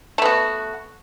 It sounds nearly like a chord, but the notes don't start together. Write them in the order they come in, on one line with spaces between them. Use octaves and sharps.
A3 B3 F#4